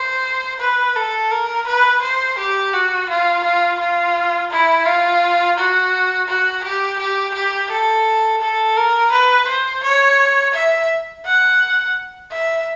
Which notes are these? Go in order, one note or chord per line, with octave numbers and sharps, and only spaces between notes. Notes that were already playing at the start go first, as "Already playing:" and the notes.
Already playing: C5
B4
A4
A#4
B4
C5
G4
F#4
F4
F4
F4
E4
F4
F#4
F#4
G4
G4
G4
A4
A4
A#4
B4
C5
C#5
E5
F#5
E5